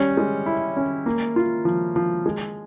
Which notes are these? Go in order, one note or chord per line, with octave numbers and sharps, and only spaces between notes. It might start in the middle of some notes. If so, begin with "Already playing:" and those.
Already playing: G3 C#4
G#3
E4
C#4
A#3
F4
F3
F3
G#3